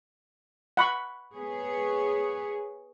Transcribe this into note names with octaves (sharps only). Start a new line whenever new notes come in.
F#5 B5 C#6
B3 G#4 C#5